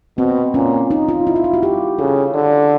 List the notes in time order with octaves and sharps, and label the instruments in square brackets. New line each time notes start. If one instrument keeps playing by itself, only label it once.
[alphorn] B2 [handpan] C4
[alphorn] A#2 [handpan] C#4
[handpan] D#4
F4
E4
F4
E4
F#4
G4
[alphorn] C#3 [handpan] A4
[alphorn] D3